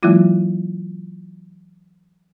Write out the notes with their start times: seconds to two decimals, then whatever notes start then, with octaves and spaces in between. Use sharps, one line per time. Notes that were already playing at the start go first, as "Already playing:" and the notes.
0.03 E3 F#3 G#3 A#3 E4 F4